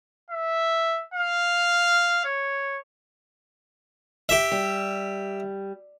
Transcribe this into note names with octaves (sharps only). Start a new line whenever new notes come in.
E5
F5
C#5
G4 E5
G3